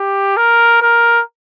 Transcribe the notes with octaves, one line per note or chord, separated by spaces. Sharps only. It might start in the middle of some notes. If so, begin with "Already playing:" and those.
Already playing: G4
A#4
A#4